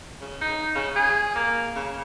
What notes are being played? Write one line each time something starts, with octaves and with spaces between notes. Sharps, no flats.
C#3
D#4
C#3
G#4
A#3
C#3